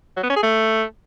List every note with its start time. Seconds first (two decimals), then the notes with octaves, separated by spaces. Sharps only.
0.17 F#3
0.23 B3
0.30 C#4
0.36 G#4
0.43 A3